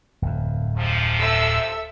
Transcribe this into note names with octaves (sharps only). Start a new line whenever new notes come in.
D1 F2
G#2 C3 F3
A4 E5 E6